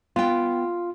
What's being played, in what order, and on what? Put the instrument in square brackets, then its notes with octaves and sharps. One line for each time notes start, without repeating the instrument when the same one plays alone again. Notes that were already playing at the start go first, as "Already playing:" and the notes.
[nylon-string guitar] B3 G5 [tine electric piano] F4